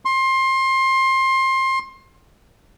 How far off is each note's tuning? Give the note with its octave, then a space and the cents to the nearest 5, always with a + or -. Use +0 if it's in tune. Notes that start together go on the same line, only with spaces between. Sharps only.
C6 +25